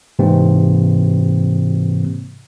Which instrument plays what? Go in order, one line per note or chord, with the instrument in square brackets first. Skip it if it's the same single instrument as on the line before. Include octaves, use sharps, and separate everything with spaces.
[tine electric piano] G#2 C3 E3 A#3 C4